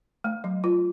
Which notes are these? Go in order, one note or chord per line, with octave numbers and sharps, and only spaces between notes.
A3
F#3
F4